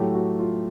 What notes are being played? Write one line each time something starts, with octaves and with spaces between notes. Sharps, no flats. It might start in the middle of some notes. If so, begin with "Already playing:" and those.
Already playing: A2 F#3 A3 G4
F#4
F4